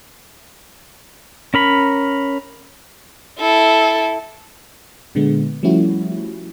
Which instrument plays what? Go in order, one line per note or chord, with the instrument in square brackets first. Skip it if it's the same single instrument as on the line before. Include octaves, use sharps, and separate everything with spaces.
[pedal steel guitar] C#4 A#4 B5
[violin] E4 A4
[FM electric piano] A#2 D3 G#3 B3
F3 G3 A3 C#4 E4 F#4